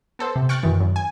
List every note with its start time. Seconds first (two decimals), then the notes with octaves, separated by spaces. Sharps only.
0.19 B3 A4 C5
0.36 C3
0.49 G5 C#6 F6 F#6 A6
0.63 F#2 D#3 E3
0.81 F#2
0.96 G#5